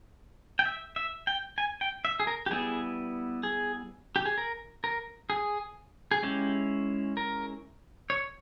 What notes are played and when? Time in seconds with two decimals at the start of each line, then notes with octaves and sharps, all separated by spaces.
0.59 G5
0.65 E5
0.96 E5
1.27 G5
1.58 G#5
1.81 G5
2.05 E5
2.20 G#4
2.27 A#4
2.46 G4
2.51 G3 B3 E4 G#4
3.43 G#4
4.16 G4
4.26 G#4
4.38 A#4
4.84 A#4
5.30 G#4
6.11 G#4
6.23 G#3 C#4 E4 G4
7.17 A#4
8.10 C#5